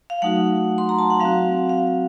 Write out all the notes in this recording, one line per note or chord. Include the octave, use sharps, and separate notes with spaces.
F5
F#3 A3 D#4 F#4 F#5
C6
A#5
A5
F#5
F#3 C4 F#4 F5
F5